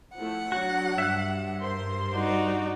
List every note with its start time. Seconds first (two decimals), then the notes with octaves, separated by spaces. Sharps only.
0.16 F3 A3 E4 F#5
0.52 F#3 D4 F#4
0.98 G2 E5 F#6
1.60 A#4 C5 C6
2.15 D#4 F#4 D5